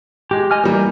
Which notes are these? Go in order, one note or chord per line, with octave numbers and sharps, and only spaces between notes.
G#3 G4
D#5 G#5 F6
E3 G3 A#3 A#4